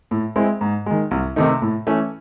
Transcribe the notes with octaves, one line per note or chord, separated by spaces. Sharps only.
A2
G#3 C4 E4
G#2
D#3 G#3
C2
C3 D#3 A3 D#4
A2
E3 A3 C#4